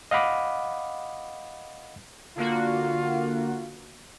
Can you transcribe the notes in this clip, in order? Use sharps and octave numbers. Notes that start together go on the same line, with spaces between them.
D#5 F5 F#5 B5 D6 D#6
D3 A#3 F4 F#4